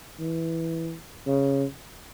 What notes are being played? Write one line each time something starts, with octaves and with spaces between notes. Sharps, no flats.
E3
C#3